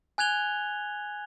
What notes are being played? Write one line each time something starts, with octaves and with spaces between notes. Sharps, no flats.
G#5 F#6 G#6 F7 G7